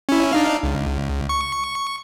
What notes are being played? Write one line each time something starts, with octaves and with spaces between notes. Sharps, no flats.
C#4 E4
D4 D#4 F5
C#2
C#6